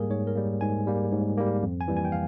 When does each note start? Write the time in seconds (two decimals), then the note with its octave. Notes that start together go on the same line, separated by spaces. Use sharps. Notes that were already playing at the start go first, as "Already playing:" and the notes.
Already playing: G#2 G3 A#3 G#4 A#4
0.10 G#2 C#5
0.27 A#4
0.35 G3 A#3
0.61 G#2 G#5
0.87 G3 A#3
1.12 G#2
1.37 G3 A#3
1.63 F2
1.81 G#5
1.88 E3 G3 A#3
1.97 G#5
2.05 G5
2.12 F5